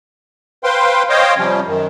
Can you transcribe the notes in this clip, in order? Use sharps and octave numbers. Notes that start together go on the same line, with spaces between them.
B4 C5 F5 G5 C6
C5 C#5 D#5 F5 G5
C3 F3 G3 C#4
F#2 D#3